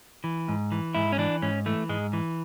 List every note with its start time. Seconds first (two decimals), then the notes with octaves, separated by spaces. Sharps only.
0.24 E3
0.49 G#2
0.72 E3
0.95 G#2 E4
1.12 C#4
1.18 E3 D4
1.42 G#2 C#4
1.66 E3 A3
1.89 G#2 G#3
2.13 E3